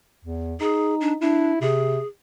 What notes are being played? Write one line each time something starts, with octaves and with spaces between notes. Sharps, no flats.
E2
D#4 G#4
D4
D4 E4
C3 G#4